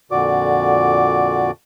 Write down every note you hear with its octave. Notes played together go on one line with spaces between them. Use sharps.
F2 A#2 D3 F#4 D5 D6